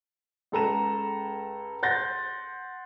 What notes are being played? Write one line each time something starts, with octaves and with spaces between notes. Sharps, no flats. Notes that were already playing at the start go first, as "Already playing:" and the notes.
C#2 A4 A#5 E7
F#5 C6 G6 A6 A#6